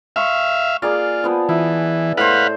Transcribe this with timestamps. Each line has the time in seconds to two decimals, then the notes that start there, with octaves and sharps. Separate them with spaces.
0.16 E5 F5 C6 C#6
0.82 A#3 F4 G#4 D5
1.24 F3 B3
1.49 E3 E4
2.17 A2 B4 C5 F5 F#5